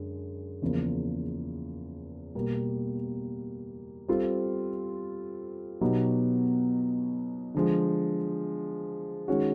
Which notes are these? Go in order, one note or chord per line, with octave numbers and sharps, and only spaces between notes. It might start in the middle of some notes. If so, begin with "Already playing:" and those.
Already playing: F#2 D3 G#3
E2 C#3 F3 A#3
B2 G3 A#3
G3 C4 F4 A4 C5
B2 F#3 B3 D#4 G4
D3 F3 G#3
D#3 G#3 C#4 F#4